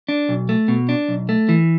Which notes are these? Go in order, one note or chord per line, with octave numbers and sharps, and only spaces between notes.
D4
B1
A3
B2
D4
B1
A3
E3